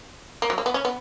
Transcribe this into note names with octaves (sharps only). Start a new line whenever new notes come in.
A#3
F#3
A#3
B3
C#4
B3